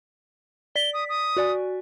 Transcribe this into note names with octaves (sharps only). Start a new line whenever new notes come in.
D5 B6 G7
D#6
D#6
F#4 D5 G#5